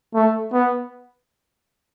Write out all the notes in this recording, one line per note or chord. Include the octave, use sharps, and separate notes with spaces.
A3
B3